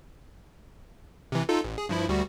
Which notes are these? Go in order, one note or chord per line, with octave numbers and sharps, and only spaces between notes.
C3 E3
D#4 F4 A4
A1
G#4
G2 F3 E4
D2 G3 F#4